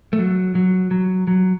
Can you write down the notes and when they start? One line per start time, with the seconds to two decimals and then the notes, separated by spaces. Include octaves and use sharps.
0.13 A3
0.19 F#3
0.55 F#3
0.91 F#3
1.27 F#3